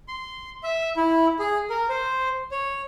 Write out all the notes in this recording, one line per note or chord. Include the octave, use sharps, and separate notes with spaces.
C6
E5
E4
G#4
A#4
C5
C#5